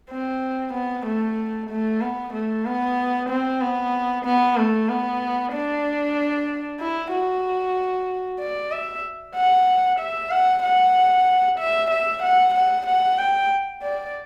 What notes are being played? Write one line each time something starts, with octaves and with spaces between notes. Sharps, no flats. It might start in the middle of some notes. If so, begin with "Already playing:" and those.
C4
B3
A3
A3
B3
A3
B3
C4
B3
B3
A3
B3
D4
E4
F#4
D5
E5
F#5
E5
F#5
F#5
E5
E5
F#5
F#5
F#5
G5
D5